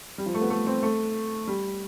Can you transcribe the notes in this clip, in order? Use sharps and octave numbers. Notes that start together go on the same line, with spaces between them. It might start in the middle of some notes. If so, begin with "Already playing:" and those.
G3
F3
A3
B3
A3
C4
A3
G3